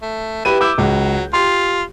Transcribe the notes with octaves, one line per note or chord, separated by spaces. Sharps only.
A3
E4 G4 B4 D#7
E4 D6 E6 G6
C#2 F#3
F4 G4 C6